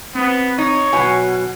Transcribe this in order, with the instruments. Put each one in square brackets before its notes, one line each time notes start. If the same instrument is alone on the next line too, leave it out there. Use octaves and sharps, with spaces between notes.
[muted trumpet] B3 [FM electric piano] C4
[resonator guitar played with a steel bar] D#4 [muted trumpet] C#5
[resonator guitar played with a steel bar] B2 F#3 [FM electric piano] G#5